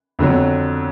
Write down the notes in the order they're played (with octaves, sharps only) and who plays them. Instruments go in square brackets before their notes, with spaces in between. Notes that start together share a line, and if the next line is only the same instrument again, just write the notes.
[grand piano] F2 D3 F#3